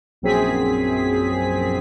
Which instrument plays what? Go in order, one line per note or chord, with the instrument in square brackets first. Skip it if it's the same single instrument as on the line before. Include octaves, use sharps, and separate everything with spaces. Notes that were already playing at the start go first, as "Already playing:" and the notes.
[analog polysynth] A#1 F#2 C4 G#4 B6